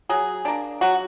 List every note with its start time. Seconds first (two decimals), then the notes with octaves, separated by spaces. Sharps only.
0.09 F#3 G#4
0.45 A#3 D4
0.81 F#3 F#4